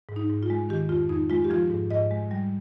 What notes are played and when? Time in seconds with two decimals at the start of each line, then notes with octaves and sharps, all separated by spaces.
0.09 G#2
0.16 D#4
0.30 G#2
0.43 F4
0.50 G#3
0.69 D#3 G4
0.89 F2 F4
1.09 F2 D#4
1.30 G#3 F4
1.44 G4
1.50 F3 F4
1.70 G#2
1.91 G#2 D#5
2.11 G#3
2.31 G3